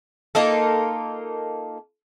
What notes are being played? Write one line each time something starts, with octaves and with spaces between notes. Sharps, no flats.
A#3 D#4 F4 A4